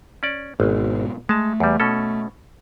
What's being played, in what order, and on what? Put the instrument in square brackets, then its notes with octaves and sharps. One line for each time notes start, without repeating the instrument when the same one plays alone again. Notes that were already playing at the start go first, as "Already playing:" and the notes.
[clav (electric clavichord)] C#4 D5
[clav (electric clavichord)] G#1 [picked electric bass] G#2 B2
[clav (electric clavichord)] G#3 A5 [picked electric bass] A3
[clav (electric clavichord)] E2 G3
B2 C#4 A4